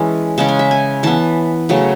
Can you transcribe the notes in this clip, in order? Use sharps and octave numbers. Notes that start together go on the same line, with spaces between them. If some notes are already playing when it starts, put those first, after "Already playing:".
Already playing: E3 G#3 C#4 A5
C#3 G#3 C#4 A5
G#5
E5
G#5
E3 B3 A5
C#3 F#3 A3